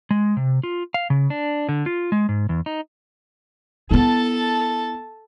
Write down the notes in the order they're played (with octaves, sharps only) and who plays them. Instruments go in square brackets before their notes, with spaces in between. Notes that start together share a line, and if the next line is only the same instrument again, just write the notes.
[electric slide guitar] G#3
C3
F4
F5
C#3
D4
D3
F4
G#3
G#2
E2
D#4
[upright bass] B3 E4 [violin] A4 A5